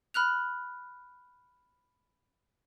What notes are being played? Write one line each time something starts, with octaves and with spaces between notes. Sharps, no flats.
B5 F6 F#6 F7